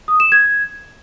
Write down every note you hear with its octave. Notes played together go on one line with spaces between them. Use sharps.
D#6
E7
G#6